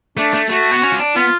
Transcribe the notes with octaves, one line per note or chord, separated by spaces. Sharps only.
A3 D4
A3
A3 F#4
B3
C#4
F4
D4
B3 F4